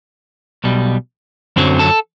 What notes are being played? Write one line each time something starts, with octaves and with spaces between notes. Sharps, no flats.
B1 B2 G3
F#2 D3 F#3 C4
A4